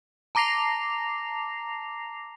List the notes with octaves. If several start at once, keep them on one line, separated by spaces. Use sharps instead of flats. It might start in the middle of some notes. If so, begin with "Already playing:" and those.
A5 A#5 D6 A#6 C7 F7